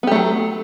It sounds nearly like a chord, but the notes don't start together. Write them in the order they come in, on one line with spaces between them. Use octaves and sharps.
B3 G4 A3 F#3